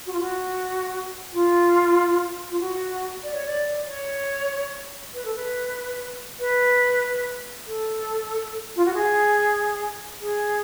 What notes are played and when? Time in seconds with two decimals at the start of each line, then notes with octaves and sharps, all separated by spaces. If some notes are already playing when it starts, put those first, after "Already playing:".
0.06 F#4
0.13 F4
0.21 F#4
1.33 F4
2.50 F4
2.60 F#4
3.23 D5
3.34 C#5
3.46 D5
3.86 C#5
5.13 B4
5.25 A4
5.35 B4
6.39 B4
7.67 A4
8.76 F4
8.85 F#4
8.94 G#4
10.20 G#4